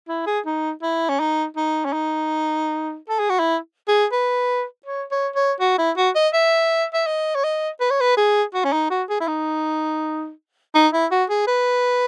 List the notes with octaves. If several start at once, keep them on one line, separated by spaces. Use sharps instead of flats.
E4
G#4
D#4
E4
C#4
D#4
D#4
C#4
D#4
A4
G#4
F#4
E4
G#4
B4
C#5
C#5
C#5
F#4
E4
F#4
D#5
E5
E5
D#5
C#5
D#5
B4
C#5
B4
G#4
F#4
C#4
D#4
F#4
G#4
E4
D#4
D#4
E4
F#4
G#4
B4